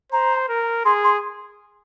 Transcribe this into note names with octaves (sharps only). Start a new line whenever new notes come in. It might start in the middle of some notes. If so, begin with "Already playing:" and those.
C5 A#5
A#4
G#4 C6
C6